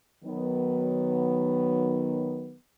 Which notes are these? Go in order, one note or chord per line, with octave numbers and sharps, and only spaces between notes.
D#3 F#3 B3